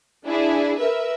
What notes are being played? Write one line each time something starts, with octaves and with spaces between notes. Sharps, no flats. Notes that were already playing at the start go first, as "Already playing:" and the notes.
D4 E4 G#4
A#4 B4 E5